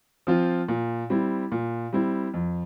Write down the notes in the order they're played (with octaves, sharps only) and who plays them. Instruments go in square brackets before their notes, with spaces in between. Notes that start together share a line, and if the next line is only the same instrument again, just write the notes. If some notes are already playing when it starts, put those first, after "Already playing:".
[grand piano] F3 C4 F4
A#2
G3 C4 E4
A#2
G3 C4 E4
F2